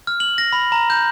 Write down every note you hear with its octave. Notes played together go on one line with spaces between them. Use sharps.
F6
F#7
A#6
B5
A#5
G6